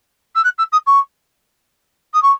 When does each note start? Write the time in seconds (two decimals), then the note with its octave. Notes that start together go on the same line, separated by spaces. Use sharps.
0.35 E6
0.44 F#6
0.58 E6
0.72 D#6
0.86 C#6
2.13 D#6
2.22 C#6